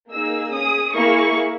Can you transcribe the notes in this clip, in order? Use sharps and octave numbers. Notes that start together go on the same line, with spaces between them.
A#3 D#4 G#4 E6
C#4 G#4 D#6
A#3 E4 G#4 C#6